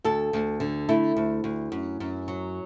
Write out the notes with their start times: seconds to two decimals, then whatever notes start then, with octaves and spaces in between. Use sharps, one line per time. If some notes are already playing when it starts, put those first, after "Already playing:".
0.04 D2 A4
0.33 D2
0.60 D3
0.89 A3 E4
1.16 D2
1.44 D2
1.72 F#2
2.00 F#2
2.28 F#3